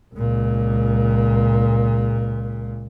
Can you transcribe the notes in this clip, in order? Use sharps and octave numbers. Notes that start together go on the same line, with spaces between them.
C#2 A#2